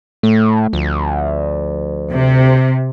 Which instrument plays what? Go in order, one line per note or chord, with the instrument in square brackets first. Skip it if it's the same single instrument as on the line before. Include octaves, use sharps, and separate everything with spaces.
[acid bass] A2 [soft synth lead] A3
[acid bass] D2 [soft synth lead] F3
[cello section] C3